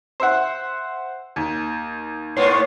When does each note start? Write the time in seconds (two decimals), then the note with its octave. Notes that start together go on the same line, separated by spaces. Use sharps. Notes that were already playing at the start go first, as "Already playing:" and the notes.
0.20 C5 E5 F#5
1.36 D#2
2.37 G#2 A#3 B3 C#5 C6